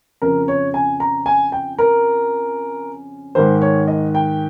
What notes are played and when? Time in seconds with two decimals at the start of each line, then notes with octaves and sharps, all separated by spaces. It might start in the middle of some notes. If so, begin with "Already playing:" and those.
0.22 F2 C#3 A#4
0.48 C#5
0.74 G#5
1.00 A#5
1.26 G#5
1.52 G5
1.79 A#4
3.35 G#2 D#3 C5
3.62 C#5
3.88 D#5
4.15 G5